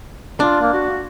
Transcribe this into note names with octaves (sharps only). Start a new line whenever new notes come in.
D4 F4
A#3
F#4